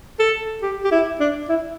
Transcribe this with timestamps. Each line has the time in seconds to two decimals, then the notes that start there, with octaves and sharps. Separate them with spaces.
0.19 A4
0.62 G4
0.84 G4
0.92 E4
1.20 D4
1.49 E4